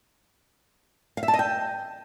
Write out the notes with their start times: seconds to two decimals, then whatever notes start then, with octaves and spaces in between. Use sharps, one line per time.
1.17 F5
1.23 E5
1.28 A5
1.34 D#5
1.39 G5